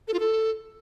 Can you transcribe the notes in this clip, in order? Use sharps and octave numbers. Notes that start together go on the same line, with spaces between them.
A4
F4
A4